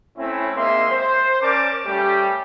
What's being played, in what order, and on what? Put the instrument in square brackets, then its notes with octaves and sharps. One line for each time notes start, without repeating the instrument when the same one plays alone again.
[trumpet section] A3 C4 C#4 E4
G#3 A#3 C4 D#4 E5 C6
C5
C#4 A#4 D5 A5 D6
G3 A3 C#4 G4